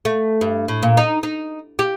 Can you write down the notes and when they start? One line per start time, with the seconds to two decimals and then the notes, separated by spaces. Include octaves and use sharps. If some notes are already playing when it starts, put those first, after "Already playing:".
0.05 A3
0.41 G2
0.68 A2
0.83 A#2
0.97 D#4
1.23 D#4
1.79 G4